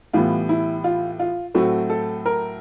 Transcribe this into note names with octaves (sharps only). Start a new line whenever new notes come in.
A2 E3 G3 B3 F4
E4
F4
F4
A2 F#3 A3 C4 F#4
A4
A#4